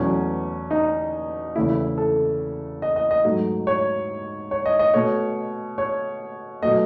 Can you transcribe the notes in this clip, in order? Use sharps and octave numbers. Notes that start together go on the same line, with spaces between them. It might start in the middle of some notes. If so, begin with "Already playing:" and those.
Already playing: E2 B2 F#3 A3 C#4
D#4
E2 C#3 E3 A3 E4
E4
A4
D#5
D#5
D#5
G#2 F#3 A3
C#5
C#5
D#5
D#5
B2 A3 C#5
C#5
B2 F#3 A3 D#5